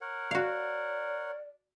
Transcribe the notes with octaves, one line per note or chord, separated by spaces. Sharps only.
A#4 C#5 F#5
F#4 D5 F5